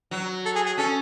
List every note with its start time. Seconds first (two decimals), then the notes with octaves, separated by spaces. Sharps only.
0.11 F#3
0.46 A4
0.55 G#4
0.67 G#4
0.78 C#4 A4